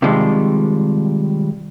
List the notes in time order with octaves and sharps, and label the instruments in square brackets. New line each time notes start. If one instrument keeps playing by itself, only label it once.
[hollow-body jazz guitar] C3 D#3 F3 G3 G#3